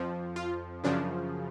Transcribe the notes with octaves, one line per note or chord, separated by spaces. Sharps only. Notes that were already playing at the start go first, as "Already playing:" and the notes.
Already playing: F2 F3
F4
F#2 C#3 F3 D4